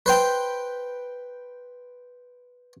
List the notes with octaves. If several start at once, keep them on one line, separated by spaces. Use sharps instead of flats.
B4 C5 G5